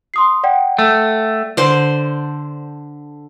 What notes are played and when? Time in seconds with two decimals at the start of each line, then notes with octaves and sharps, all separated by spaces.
0.14 C6 D#6 C7
0.44 D5 F#5 G5
0.79 A3
1.57 D3 C5 C6